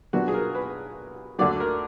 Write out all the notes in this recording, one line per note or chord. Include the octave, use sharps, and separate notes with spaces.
B1 A#2 F#3 B3 D4 F#4
G#4
A#4
B4
D2 D3 F#3 D5
A#4